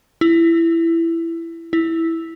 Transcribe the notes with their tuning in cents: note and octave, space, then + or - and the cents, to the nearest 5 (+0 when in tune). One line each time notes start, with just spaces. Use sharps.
E4 +15
E4 -5